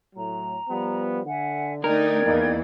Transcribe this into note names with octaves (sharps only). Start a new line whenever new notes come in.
A2 F#3 A#5
F3 G3 B3
D3 E5 F#5 G#5
A3 D#4 A#4 D5 G5 G#6
E2 E3 A#3 D#4